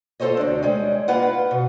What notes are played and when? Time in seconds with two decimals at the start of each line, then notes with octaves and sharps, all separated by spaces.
0.20 F4 A4 C5 C#5 D#5
0.37 D2 D4
0.63 G3 G#3 C#4
1.08 A#3 F4 B4 F#5
1.51 B2